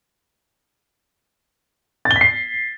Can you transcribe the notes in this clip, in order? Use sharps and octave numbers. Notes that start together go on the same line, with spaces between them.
A6
G7
B6
C7